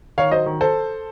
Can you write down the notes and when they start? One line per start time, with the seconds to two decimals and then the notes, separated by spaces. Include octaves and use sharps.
0.18 D#3 C#5 F5
0.31 F#3 C5 D#5
0.46 D#3
0.61 A4 C5